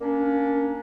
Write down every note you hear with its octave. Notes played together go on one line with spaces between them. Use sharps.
A#3 C#4 D4